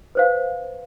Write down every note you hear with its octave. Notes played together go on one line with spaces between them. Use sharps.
B4 C5 F5